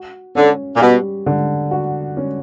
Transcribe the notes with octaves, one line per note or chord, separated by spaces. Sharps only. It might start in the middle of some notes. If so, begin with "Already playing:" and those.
Already playing: F#4
D3 C#4
A#2
B2 G3
D3
F#4
C#4